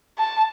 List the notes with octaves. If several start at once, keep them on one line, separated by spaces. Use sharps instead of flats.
A5